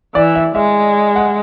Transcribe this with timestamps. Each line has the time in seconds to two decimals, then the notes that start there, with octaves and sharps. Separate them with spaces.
0.15 E3 D5
0.35 E5
0.55 G#3 E5
1.15 F#5